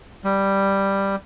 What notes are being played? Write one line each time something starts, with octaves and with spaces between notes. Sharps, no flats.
G3